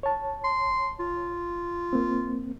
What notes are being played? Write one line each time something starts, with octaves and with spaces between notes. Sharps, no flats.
C#5 A5
C6
F4
A#3 C4